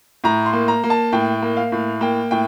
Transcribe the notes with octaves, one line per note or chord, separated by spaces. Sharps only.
A2 A#5
C6
A#3
A#5
A#3
A5
A2 G5
A#3
F5
A2
A#3 G5
A2 G5